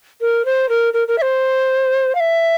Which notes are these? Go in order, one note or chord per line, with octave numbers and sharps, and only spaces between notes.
A#4
C5
A#4
A#4
A#4
E5
C5
F5
E5